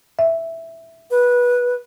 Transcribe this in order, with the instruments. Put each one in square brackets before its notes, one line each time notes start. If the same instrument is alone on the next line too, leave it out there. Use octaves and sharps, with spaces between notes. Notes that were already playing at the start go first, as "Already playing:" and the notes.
[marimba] E5
[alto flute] B4